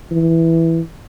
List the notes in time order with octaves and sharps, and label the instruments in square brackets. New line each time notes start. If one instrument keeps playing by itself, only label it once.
[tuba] E3